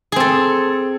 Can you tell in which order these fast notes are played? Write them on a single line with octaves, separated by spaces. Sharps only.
G#4 C4 A4